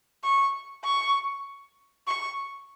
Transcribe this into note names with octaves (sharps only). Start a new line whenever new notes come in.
C#6
C#6
C#6